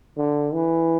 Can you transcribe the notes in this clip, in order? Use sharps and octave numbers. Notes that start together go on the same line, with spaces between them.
D3
E3